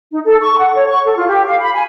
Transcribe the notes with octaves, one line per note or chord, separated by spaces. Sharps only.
D#4
A4
C#6
F#5
C#5
C#6
A4
F4
G4
F5
B5
G#5